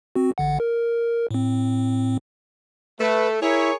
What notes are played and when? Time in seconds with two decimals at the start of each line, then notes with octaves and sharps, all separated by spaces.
0.15 C4 F#4
0.38 A1 D3 F#5
0.60 A#4
1.31 A2 C4
2.99 A3 B4
3.41 E4 G#4 A#4 C#5